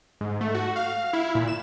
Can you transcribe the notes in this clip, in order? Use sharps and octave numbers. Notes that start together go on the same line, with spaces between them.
G#2
A3
F#4
F5
E4
A#2
E7